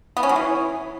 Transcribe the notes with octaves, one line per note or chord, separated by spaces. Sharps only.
B3
C#4
F#3
E3